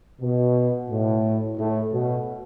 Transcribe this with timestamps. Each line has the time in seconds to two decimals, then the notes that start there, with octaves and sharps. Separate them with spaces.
0.21 B2
0.90 A2
1.58 A2
1.92 B2